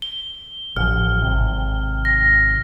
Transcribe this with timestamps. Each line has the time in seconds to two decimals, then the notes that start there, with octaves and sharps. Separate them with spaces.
0.02 G7
0.76 A1 F3 F6
1.22 G#1 C3
2.05 A#6